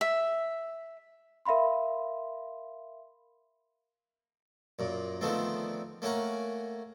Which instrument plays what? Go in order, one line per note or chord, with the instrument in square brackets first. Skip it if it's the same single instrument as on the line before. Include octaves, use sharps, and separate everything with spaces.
[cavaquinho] E5
[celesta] A#4 E5 F5 B5 C6
[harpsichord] F#2 A#2
D3 D#3 F3 A3 B3 C4
A3 A#3 C#4 A#4 F#5